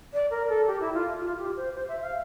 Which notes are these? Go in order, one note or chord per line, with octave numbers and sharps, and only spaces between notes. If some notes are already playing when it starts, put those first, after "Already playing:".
D5
A#4
A4
G4
E4
F4
F4
G4
C5
C5
E5
F5